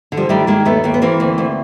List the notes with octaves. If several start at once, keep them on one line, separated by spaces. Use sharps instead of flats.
D3
F3 G3
D#3 G3 A3
D#3 G#3 A#3
D#2 A3 B3
D#2 A#3
B3
E3 A#3 C4
D2
D2